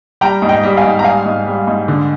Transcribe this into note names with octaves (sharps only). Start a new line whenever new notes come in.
G3 G5 A#5
G#2
D#5 G5
G3
F5 G#5
G#2
A#5
G3 F5 G#5
G#2
G3
G#2
D3